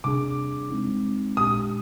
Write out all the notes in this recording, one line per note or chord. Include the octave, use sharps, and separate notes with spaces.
C3 G3 D4 G#4 D6
G#3 C4 D#4
A#2 G#3 D4 G4 D#6